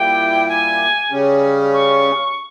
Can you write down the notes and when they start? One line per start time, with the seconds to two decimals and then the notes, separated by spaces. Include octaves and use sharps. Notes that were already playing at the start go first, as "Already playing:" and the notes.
Already playing: A#2 G3 A#3 E4 G4 G5
0.49 G#5
1.10 C#3 G3 C#4
1.73 C#6